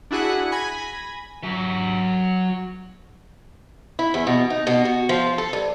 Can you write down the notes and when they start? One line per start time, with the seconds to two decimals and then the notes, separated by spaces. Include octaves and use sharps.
0.11 D4 E4 F#4 G#4 F#5
0.52 G#5 B5 G#6 A#6
1.43 F#3 E5
3.99 E4
4.14 E2
4.27 B2
4.50 D#4
4.67 B2
4.85 F#4
5.09 F3
5.38 A4
5.53 G2